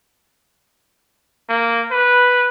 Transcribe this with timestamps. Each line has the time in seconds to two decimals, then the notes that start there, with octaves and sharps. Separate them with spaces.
1.49 A#3
1.91 B4